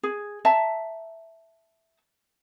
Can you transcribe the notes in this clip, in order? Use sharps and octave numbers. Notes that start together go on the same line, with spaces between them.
G#4
E5 A5 A#5